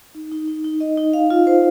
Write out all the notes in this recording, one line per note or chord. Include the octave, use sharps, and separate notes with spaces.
D#4
D#4
D#4
D#4
D#5
D#4
F5
F4
C5